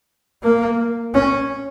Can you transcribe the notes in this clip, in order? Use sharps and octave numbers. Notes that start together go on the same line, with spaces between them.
A#3
C#4